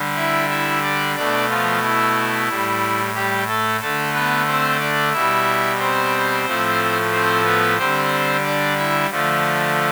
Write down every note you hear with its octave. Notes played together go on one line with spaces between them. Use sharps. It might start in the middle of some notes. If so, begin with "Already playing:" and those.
Already playing: D3 G3
E4 E5
E4 E5
D4 D5
B2 A3 D4 D5
F3 F4
E4
A2 G3
G3 G4
A3 A4
D3 A3 A4
B3 B4
C4 C5
D4 D5
B2 G3 E4 E5
C4 C5
A2 F3 A3
C4 C5
B3 B4
D3 G3 C4 C5
D4 D5
E4 E5
D3 F3 A3